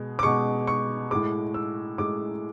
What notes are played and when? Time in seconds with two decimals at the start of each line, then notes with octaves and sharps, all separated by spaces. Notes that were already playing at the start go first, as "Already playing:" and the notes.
Already playing: B2 G#3
0.19 D6
0.23 B2 G#3 C#6
0.67 C#6
1.11 A2 G#3 D6
1.54 E6
1.98 A2 G#3 D6